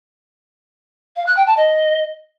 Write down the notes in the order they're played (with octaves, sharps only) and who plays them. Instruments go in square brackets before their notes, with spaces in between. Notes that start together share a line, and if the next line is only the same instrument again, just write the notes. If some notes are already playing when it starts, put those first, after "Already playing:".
[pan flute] F5
F#6
G5
A5
D#5